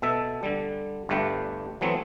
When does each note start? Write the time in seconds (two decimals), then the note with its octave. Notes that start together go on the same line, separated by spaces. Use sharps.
0.02 B2 A4 E5
0.43 D3 G3
1.09 G1 G2 A3 G4 B4 G5
1.81 E3 F#3 A3 B3 C4